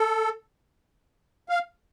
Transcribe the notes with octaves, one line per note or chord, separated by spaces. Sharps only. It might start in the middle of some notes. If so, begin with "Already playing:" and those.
Already playing: A4
F5